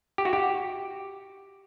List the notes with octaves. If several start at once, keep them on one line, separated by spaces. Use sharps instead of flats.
G4
F#4
G4